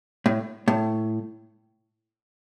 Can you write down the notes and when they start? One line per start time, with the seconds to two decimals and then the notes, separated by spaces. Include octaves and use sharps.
0.26 A2
0.68 A2